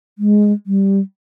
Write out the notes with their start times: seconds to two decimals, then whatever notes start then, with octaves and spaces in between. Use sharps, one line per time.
0.18 G#3
0.67 G3